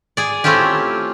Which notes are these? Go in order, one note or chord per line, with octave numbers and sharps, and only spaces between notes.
G#4 D5
A3 C4 C#4 E4 F4 G4